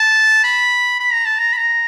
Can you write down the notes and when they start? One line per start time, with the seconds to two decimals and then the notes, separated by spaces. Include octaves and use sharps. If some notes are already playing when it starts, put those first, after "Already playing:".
Already playing: A5
0.44 B5
1.00 B5
1.13 A#5
1.25 A5
1.39 A#5
1.53 B5
1.57 A#5